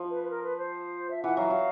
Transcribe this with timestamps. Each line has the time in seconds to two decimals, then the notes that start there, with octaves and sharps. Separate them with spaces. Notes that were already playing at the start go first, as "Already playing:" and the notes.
Already playing: F3
0.10 B4
0.24 B4
0.31 A#4
0.43 B4
0.58 C5
1.10 E5
1.23 E3 F#5
1.37 F#3 F5
1.50 F#3 F5